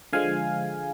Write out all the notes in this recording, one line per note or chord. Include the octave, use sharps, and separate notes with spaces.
D3 F3 G#3 F5 G#5